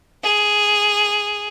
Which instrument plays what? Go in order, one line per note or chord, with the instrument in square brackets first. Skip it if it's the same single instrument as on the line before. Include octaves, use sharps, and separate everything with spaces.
[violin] G#4